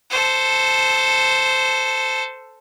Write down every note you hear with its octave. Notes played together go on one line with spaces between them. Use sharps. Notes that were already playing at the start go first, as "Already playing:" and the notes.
A4 C5